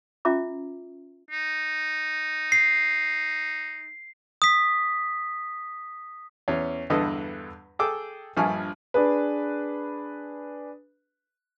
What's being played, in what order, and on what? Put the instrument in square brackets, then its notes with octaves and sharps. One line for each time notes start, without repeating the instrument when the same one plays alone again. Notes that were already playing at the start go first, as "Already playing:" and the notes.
[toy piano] C#4 F4 E5 A#5 D6
[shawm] D#4
[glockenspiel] C7
D#6 B6
[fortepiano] E2 C#4
E2 G2 D3 A4 B4 D#5
G#4 A4 G5 D6 E6
A#1 G2 F3 G#5 C#6 F6
[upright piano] D4 G#4 B4